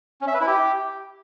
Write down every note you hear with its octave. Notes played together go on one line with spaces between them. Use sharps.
C#4
E5
B4
E4
G4